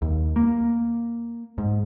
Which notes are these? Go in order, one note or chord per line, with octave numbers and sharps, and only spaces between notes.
D#2
A#3
G#2